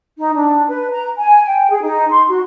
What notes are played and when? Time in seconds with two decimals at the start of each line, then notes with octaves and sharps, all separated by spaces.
0.18 D#4
0.35 D4
0.69 B4
0.91 A#5
1.17 G#5
1.45 G5
1.70 G#4
1.83 D#4
2.11 C6
2.29 F#4